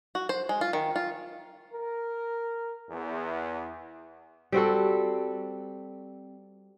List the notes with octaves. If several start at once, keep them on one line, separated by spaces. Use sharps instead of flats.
F#4
C5
G#3
F4
D#3
F4
A#4
E2
G3 C4 F#4 A4